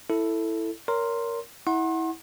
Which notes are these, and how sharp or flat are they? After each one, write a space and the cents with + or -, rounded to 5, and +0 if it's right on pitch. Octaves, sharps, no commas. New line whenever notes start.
E4 +0 A4 +10
A#4 +0 C#5 +25 C6 +0
E4 -25 F#5 +0 C6 +40